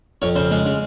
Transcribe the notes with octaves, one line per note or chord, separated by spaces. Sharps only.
F2 C#5
C#3 C5
G#3
C#3